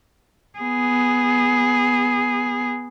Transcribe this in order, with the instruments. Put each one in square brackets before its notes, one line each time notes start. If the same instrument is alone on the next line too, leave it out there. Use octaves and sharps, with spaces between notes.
[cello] B3 G#4